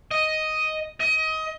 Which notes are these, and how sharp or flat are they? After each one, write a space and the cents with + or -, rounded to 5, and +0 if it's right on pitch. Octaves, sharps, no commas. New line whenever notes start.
D#5 +5
D#5 +25